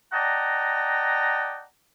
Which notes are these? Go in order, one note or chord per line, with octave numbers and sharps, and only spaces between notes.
D5 D#5 F#5 G5 A5 A#5